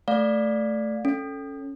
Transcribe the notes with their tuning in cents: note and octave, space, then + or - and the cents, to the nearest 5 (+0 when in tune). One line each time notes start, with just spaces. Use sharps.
A3 +0 D5 +0 F5 +20
C#4 +0 A4 +0